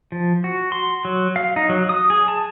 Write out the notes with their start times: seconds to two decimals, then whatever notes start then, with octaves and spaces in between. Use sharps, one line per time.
0.12 F3
0.44 F#4
0.72 C6
1.05 F#3
1.36 F5
1.56 D#4
1.69 F#3
1.89 D#6
2.10 G#4
2.28 A5